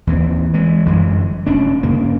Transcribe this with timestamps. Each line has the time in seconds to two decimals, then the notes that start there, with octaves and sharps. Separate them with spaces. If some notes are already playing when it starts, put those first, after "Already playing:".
0.07 D#2 E3 C4
0.54 E3 G#3
0.86 G1 F#2 E3 G#3
1.46 F1 C#4 D4
1.83 G2 C#3 A#3